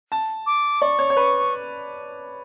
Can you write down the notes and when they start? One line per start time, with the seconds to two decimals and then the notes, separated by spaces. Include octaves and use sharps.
0.12 A5
0.46 D6
0.82 D5 C#6
0.99 C#5
1.10 C#5
1.17 B4